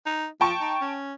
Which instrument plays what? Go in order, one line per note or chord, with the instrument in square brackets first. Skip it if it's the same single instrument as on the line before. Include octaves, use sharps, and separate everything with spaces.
[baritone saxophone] D#4
[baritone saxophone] F3 [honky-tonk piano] G5 A5 C#6
[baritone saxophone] D#4
C#4